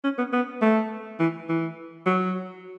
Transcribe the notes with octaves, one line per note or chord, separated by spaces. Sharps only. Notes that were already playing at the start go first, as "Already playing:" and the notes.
C#4
B3
B3
A3
E3
E3
F#3